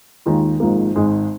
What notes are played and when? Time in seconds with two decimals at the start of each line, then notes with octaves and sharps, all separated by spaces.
0.26 D#2 D#3 G#3 F4
0.60 G#1 G#2 F3 A#3
0.95 G#1 G#2 G#3